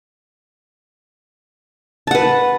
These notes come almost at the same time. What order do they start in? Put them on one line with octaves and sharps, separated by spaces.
A5 F#5 B4